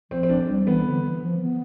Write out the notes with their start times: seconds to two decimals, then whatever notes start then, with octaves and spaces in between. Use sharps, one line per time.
0.11 F3 C4
0.23 C4
0.29 D4
0.48 G3 C4
0.67 E3 B3
0.85 D3
1.03 E3
1.22 F3
1.40 B3